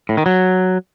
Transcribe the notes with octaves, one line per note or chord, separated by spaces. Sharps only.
A2
D#3
F#3